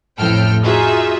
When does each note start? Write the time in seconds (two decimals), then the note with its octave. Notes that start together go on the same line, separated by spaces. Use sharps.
0.18 A1 F2 A2 A4 G5 F6
0.63 D#4 F4 F#4 G#4 E5